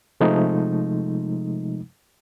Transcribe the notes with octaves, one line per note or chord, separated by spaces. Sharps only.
C3 F3 G#3 A3 D#4